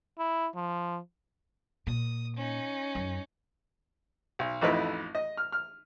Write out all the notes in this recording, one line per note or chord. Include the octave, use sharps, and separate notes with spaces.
E4
F3
A#2 D#6
C#4 D#4
F#2
B1
A1 F2 A3 D#4 E4 B4
D#5
F6
F6